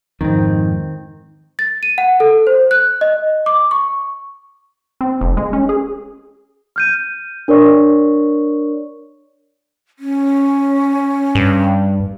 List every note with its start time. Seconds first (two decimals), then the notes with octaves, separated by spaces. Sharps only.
0.21 F2 G#2 D#3 C4
1.59 A6
1.83 D#7
1.98 F#5
2.20 A4
2.47 C5
2.71 F#6
3.01 D#5
3.46 D6
3.71 C#6
5.01 C4
5.21 F1
5.37 G#3
5.53 C#4
5.69 G#4
6.76 F6 G6 D#7
7.48 D4 A#4 C#5 D5 C#6
9.99 C#4
11.35 G2